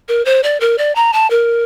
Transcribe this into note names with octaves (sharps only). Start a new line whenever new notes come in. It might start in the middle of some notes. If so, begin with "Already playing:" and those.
A#4
C5
D5
A#4
D5
A#5
A5
A#4